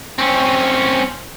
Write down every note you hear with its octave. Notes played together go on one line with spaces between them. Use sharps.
C4 C#4